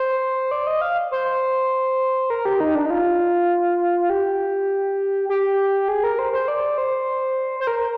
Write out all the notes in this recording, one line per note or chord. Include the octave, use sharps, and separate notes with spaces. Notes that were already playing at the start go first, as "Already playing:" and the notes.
Already playing: C5
D5
D#5
F5
C5
A#4
G4
D#4
D4
D#4
F4
G4
G4
G#4
A#4
C5
C5
D5
C5
C5
A#4